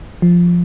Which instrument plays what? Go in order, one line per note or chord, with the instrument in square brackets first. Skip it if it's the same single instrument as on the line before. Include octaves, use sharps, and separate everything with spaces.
[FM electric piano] F3